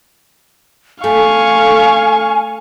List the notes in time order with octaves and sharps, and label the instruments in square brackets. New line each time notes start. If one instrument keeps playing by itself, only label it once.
[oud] A3 [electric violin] F5 C#6 [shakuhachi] G#5